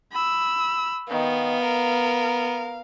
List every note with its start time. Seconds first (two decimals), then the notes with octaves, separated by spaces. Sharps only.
0.12 B5 E6
1.10 D#3 B3 F5
1.63 A#4